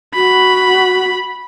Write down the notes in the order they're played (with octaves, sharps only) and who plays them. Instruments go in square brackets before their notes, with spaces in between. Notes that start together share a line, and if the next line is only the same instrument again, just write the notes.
[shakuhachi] F#4 [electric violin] B5